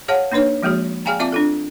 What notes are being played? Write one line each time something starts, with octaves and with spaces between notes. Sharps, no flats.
G#4 C#5 F5 F#5 A5
A#3 D4 D#4 B4 C#5
F3 G#3 A#3 F#4 G#4
G#4 D5 F5 G5 G#5 A#5
C4 F4 D5 E5 A5 D6
D4 F4 A4